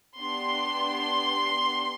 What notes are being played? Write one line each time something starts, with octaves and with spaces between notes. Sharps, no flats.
B3 D4 G4 C6